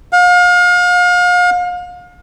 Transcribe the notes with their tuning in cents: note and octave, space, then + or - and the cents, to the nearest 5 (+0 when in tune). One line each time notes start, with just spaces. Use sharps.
F5 +35